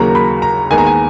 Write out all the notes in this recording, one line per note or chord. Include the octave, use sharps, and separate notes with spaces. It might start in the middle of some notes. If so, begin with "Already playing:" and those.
Already playing: D#2 C#3 F#3 A#3 A#5
B5
A#5
D#2 D#3 G#3 B3 G#5
A#5
G#5